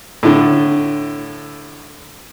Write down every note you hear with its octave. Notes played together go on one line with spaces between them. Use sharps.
A2 D3